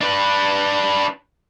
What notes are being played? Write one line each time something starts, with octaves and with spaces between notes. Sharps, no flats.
D4 B4